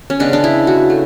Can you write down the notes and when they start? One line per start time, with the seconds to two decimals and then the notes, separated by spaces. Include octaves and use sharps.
0.10 C#4
0.20 C#3 G#3 B3 D4
0.33 D4
0.44 E4
0.67 F#4
0.90 A3